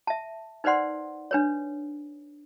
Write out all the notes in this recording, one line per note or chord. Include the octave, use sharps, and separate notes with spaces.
E5 A5
D#4 B4 C5 D5 F#5 C6
D4 B4 C#5